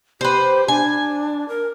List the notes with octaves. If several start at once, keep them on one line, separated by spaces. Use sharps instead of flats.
G4 B4 C5
D4 G#5
A#4